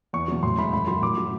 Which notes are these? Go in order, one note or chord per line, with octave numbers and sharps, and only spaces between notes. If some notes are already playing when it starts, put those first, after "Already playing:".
E2 C#6
B2 F#3
A2 C6
E3 G#3 B5
F#2 B5
D#3 F#3 C6
A2 D6
F#3